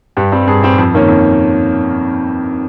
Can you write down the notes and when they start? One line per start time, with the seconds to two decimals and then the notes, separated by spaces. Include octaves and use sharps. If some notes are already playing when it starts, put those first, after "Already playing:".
0.17 G2 G4
0.32 G3 C4
0.48 G2 G#4
0.63 G3 C4
0.78 F2
0.94 D#3 A#3 C#4
1.08 F2